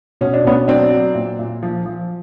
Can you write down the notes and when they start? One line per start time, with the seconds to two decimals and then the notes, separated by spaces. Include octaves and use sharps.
0.21 B2 C#4
0.34 D4
0.44 B2 B3 C#4
0.68 F#3 C4 D4
0.91 F#3
1.15 A#2
1.39 A#2
1.63 F3
1.86 F3